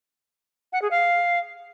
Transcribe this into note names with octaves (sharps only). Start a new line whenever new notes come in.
F#5
G#4
F5